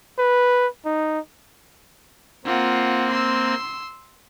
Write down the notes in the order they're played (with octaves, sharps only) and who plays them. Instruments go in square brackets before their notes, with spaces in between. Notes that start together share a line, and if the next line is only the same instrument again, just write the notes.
[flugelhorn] B4
D#4
[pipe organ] A#3 C4 [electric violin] F4 F#5
[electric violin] C6 E6